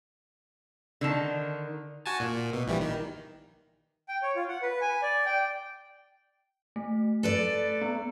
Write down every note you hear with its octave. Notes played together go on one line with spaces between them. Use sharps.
D3 D#3 A5
F#4 G#5 A5
A#2
A#2
B2
A#1 E3 G3
D#3
G5
C#5
F4
F#5
B4
G#5
D5
G5
A3
A4 B4 D5
B3